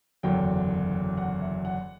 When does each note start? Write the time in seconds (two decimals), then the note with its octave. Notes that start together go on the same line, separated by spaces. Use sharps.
0.23 F#1 E2 D3 F#3 G5
1.17 F#5
1.42 E5
1.65 F#5